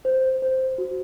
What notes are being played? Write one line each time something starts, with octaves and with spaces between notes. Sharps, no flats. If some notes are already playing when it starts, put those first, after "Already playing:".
C5
C5
F#4